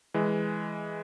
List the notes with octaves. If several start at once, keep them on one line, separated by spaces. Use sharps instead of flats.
E3 G#3